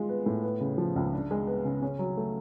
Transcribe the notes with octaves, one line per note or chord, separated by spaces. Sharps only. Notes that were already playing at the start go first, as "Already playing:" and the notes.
Already playing: G#3 F4
B3
A2
B3
C#3
F3
C#2
D4
G#3
B3
C#3
C#4
F#3
A3